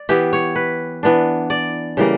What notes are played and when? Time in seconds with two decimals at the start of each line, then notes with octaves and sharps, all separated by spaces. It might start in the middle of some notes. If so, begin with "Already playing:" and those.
Already playing: D5
0.09 E3 B3 E4 G4
0.33 C#5
0.56 B4
1.03 E3 B3 D4
1.50 D5
1.97 C#3 E3 G3 A#3